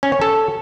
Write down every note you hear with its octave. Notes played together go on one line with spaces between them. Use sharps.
C#4
C#5
A4